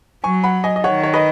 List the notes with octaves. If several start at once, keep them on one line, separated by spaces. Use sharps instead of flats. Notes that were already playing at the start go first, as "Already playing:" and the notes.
F#3 G#5 C#6
F#5 B5
D#5 G#5
D#5
D#3 C#5 F#5
C#5
B4 D#5